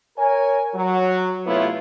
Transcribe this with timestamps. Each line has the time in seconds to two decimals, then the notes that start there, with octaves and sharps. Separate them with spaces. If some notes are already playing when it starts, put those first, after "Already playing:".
0.18 A#4 C#5 G#5
0.75 F#3
1.47 C3 A3 B3 E4 F4 C#5